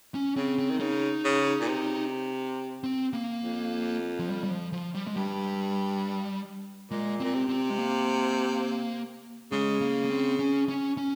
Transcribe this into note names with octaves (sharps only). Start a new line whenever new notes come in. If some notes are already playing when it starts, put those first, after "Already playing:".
C#4
C#3 C4
C4
D#3
C#3 D#4
C#3
A#2
C3
C4
A#3
F2
F3
G3
G3
F3
F3
G3
G#3
G2 G3
A#2 G#3
A#2 C4
C3
C4
G#3
A#3
C#3 G#3
A#3
A#3
C4
C#4
C#4
C#4